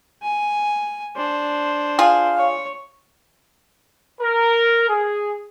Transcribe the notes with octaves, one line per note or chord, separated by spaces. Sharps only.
G#5
D4 C5
F4 G#4 F5
C#5
A#4
G#4